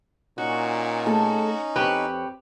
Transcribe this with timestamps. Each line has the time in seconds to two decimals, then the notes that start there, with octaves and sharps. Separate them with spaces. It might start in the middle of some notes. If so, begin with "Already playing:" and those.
0.38 A#2 C#4 D#4 F#4
1.06 A3 G#4 A4
1.76 F2 C4 G4 B4 C#5